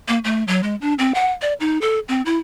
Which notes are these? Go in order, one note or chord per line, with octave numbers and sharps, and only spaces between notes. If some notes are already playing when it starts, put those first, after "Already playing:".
A#3
A3
F#3
G#3
D4
C4
F#5
D5
D#4
A4
C4
E4